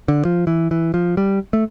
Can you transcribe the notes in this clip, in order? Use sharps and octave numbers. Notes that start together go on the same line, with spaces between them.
D3
F3
E3
E3
F3
G3
A3